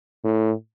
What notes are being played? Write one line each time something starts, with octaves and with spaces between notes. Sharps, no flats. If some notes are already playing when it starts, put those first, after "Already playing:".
A2